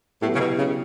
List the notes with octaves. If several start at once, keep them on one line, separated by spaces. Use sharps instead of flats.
A2 F#3 B3 E4 G4
C#3
B2
C#3